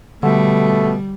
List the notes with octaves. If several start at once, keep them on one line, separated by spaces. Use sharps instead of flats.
B2 D3 G3 A3